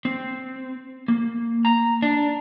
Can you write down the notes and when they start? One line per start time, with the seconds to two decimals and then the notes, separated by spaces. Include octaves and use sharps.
0.05 C4
1.08 A#3
1.65 A#5
2.02 D4